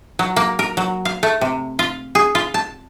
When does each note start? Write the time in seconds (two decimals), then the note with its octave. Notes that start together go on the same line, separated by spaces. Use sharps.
0.19 F#3
0.36 A#3
0.59 A#4
0.77 F#3
1.05 F5
1.23 A3
1.41 C3
1.79 F4
2.15 G#4
2.35 F4
2.54 A5